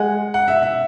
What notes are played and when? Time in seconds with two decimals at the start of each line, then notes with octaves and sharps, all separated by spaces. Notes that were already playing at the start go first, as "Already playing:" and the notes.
Already playing: G#3 F#5
0.34 F#5
0.48 E5
0.62 E5